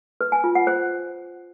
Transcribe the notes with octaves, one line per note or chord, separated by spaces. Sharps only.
B4
G#5
F4
F#5
C5